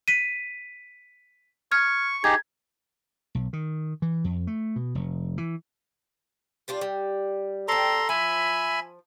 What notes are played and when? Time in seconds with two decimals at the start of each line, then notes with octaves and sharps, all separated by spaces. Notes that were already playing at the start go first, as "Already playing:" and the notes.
0.08 B6 D#7
1.72 C#6 F6 G#6
2.24 D#4 G4 G#4 G#6
3.35 B1
3.53 D#3
4.02 E3
4.24 F2
4.47 A3
4.76 B2
4.95 F1
5.38 E3
6.68 G3 D4 F4
6.81 G3
7.68 C4 A4 D5 A#5 C6
8.09 F3 E5 G#5 B5